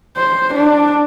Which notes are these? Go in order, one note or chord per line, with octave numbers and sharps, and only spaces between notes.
C5
D4